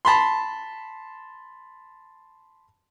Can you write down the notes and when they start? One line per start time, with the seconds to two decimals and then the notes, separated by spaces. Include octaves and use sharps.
0.05 A5 B5 C6